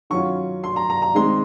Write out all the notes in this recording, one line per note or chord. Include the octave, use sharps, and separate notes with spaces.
D#3 F#3 C#4 F4 C#6
C6
A#5
A#5
A#5
D#3 G#3 C4 C6